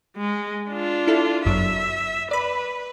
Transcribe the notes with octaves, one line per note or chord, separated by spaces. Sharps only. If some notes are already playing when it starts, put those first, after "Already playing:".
G#3
D4 F4
E4 A4
G1 F#2 F#3 E5
B4 D5 B5